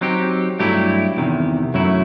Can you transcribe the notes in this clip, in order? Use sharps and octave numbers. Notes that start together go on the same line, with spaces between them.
F#3 C4 D#4 G4
G2 F#3 A3 E4 G4
E2 C3 D#3
F#2 F#3 A3 E4